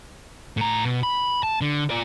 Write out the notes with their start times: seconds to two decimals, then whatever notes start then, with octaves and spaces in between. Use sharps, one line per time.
0.57 A2 A#5
0.85 B2
1.03 B5
1.43 A5
1.61 D3
1.90 F4 D5